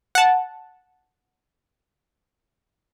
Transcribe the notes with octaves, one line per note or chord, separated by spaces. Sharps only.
F#5 A5